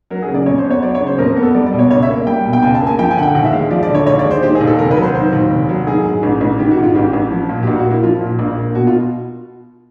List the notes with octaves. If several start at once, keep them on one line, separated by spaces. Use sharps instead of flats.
F#3 A#4
G#4
C#3
D5
F2 C#5
C5
B3
C#5
F#3 D5
C#5
C#3
C5
F2 A#4
A#4
B3
A4
G3 D5
D5
B2
C#5
C#2 C#5
E5
A#3
G3 G5
B2
G5
C#2 G#5
A5
A#3
G#5
F3 G5
G#5
D3 F#5
G5
D#2 F#5
E5
G#3 F5
F3 D5
D5
D3
C#5
D#2 C#5
D5
G#3
C5
D#3 G4
G#4
D#2
A4
F1 A#4
B4
F#3
C5
D#3 C5
D#2
F1
F#3
D#3 G#4
G#2
A1
A1
D#3 G4
F#4
G#2
F4
A1 G4
A1
F3
A#2
G4
A#1 F#4
F#4
A#3
E4
F3 F4
A#2
A#1
A#3
B2 F#4
F4